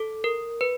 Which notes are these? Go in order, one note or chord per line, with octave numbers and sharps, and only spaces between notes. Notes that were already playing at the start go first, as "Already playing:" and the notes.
Already playing: A4
A#4
B4